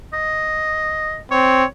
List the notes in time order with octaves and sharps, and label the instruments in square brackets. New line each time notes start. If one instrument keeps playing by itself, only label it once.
[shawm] D#5
[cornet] C4 [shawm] C#5